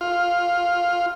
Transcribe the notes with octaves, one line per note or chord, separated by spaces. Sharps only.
F4